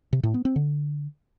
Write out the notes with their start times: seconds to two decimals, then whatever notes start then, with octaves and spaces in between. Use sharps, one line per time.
0.13 C3
0.23 A2
0.34 B3
0.45 C4
0.56 D3